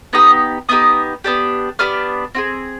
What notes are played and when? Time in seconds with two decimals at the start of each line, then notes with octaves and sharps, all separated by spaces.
0.13 B3 D#4 G4 D#6
0.69 B3 D#4 G4 D#6
1.24 B3 D4 G4
1.79 B3 D4 G4 F6
2.35 C4 F4 G#4